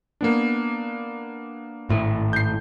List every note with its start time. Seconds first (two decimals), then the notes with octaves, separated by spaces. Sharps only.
0.21 A#3 B3 D4
1.89 G#1 A2
2.33 G6 C7